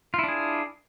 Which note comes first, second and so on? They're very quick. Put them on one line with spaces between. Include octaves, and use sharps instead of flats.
F4 E4 D4 G#4